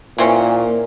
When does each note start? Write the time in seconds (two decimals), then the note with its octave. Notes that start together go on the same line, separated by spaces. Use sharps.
0.18 A#2 E3 C4 C#4